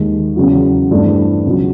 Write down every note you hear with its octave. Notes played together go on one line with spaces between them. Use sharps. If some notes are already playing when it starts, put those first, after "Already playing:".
Already playing: D#2 D#3 G#3
E2 C#3 F#3
G2 E3 A3 C4
C#2 B2 F#3